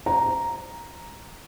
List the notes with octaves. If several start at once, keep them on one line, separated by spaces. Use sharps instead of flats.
A#5